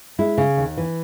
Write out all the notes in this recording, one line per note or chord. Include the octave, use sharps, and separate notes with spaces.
G#3 E4
C#3
D#2
E3